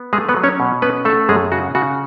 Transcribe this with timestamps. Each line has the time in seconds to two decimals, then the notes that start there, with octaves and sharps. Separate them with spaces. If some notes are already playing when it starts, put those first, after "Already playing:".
Already playing: B3
0.13 G#3 A3 G#4
0.29 B3 B4
0.37 F#3
0.44 C#4 C#5
0.60 B2
0.82 B3 C#4 B4
1.05 A3 A4
1.29 F#2 G#3 G#4
1.52 C#3 F#4
1.75 C#3 F#4